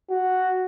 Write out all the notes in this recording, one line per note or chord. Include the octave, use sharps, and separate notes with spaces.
F#4